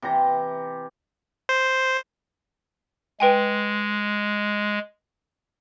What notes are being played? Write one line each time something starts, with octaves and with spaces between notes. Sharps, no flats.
C3 E3 G4 A#5
C5
G#3 B4 G5 G#5